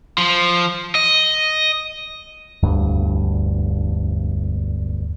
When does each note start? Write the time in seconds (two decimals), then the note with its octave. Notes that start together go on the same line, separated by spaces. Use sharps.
0.18 F3
0.95 D#5
2.63 E1 D2 G2